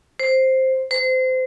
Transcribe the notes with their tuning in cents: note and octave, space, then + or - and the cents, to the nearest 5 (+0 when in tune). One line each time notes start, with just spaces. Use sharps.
C5 +5
C5 -25